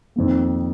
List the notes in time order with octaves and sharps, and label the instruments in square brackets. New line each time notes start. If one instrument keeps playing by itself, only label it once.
[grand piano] F2 D#3 A#3